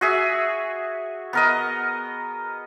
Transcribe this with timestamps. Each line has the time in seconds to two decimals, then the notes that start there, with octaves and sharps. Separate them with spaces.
0.01 F#4 G#4 E5
1.33 B3 A#4 D#5